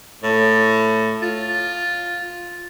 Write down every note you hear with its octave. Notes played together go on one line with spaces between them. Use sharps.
A2
F4